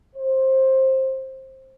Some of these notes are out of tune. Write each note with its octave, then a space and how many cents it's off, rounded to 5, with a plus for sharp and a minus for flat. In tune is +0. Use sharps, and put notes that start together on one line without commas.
C5 +15